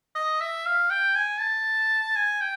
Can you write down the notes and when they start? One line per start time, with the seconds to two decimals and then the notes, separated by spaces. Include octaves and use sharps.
0.15 D#5
0.40 E5
0.66 F5
0.90 G5
1.15 G#5
1.40 A5
2.16 G#5
2.41 G5